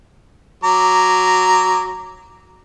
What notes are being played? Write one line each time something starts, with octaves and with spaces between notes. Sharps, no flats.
F#3 A#5 D6